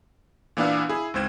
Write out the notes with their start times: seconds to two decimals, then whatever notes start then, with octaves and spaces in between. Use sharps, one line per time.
0.57 A#2 E3 B3 D4 F5 E6
0.89 E4 G#4
1.14 C#2 G#2 C4 G#6 E7